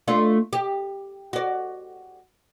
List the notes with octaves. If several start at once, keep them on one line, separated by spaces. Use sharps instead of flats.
A3 D4 F4
G4
F#4 D5